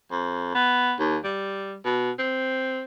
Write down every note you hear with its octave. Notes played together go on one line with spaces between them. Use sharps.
F2
B3
D#2
G3
B2
C4